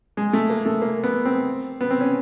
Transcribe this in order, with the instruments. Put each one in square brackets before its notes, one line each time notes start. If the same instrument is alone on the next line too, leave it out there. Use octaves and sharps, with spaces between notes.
[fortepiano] G#3
A3
A#3
A3
A#3
B3
C4
B3
C4
C#4